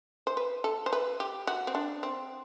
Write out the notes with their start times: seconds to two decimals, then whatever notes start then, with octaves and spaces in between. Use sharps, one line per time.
0.27 C5
0.37 B4
0.64 A4
0.86 C5
0.93 B4
1.20 G4
1.47 F#4
1.67 C4
1.75 D4
2.03 C4